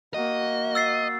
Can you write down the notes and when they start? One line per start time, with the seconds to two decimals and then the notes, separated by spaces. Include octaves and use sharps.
0.14 A#3 F#4 D#5
0.75 E6 A6 C7